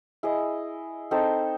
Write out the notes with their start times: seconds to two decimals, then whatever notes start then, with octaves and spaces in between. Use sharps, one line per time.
0.23 E4 G#4 D#5
1.11 C4 D#4 A4 C5